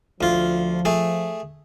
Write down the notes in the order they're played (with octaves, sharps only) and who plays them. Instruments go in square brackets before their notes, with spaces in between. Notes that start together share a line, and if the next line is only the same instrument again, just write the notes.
[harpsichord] D2 F4 [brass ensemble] F3
[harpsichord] A3 G#4